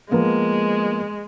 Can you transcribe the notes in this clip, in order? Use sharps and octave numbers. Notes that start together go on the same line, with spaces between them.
F3 G#3 A#3 B3